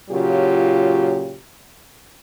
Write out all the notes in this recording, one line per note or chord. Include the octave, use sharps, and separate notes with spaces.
A#2 C#3 F#3 F4 G4